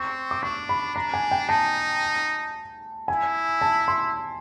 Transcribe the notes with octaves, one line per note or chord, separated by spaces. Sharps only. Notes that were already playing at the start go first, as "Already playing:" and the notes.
Already playing: C4 C#6
D6
D4 C#6
B5
D4 A#5
G#5
G5
D#4 A5
E4 G#5
A5
C6